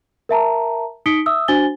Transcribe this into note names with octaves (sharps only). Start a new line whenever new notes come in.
A#4 E5 A5 A#5
D#4 D#6 B6 C#7 D7 G7
E5 D#6 E6
D4 F#4 C5 G#5 A6 G7